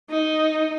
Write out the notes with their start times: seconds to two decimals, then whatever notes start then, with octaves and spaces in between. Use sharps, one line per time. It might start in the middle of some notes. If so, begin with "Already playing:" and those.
0.11 D#4